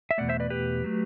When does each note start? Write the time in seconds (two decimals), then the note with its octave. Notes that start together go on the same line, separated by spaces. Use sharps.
0.11 E5
0.18 E2 B2 A3 D5 F#5
0.29 C5 E5
0.40 B4 D5
0.50 G4 B4
0.84 F#3 A3